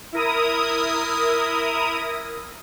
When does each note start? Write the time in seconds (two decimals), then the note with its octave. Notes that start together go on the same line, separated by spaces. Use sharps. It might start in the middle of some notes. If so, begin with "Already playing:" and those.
0.12 E4 A#4 D#6